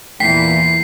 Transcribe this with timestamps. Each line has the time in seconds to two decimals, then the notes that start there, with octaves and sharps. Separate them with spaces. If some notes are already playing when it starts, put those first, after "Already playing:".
0.20 E2 A#2 E3 G5 B6 C7